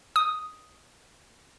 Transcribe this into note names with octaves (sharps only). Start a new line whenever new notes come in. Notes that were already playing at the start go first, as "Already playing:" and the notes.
D#6